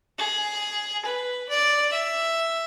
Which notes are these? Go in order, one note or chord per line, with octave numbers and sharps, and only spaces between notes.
G#4
B4
D5
E5